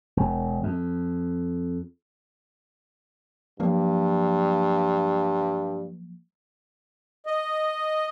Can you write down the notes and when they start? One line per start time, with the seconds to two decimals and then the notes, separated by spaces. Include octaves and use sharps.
0.17 E1
0.63 F2
3.60 G2 F3 F#3 A#3
7.26 D#5